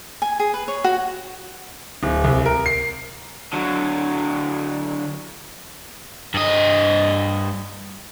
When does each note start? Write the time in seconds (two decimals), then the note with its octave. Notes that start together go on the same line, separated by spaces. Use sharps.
0.22 G#5
0.40 G#4
0.54 B4
0.68 C#5
0.84 F#4
2.03 D1
2.24 C2
2.46 A#4
2.66 C7
3.53 D3 F#3
6.34 G2 D#5